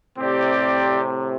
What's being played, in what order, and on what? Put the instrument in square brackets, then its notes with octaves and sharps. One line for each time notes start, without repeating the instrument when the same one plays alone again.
[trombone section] A2 C3 [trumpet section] C4 G4 D5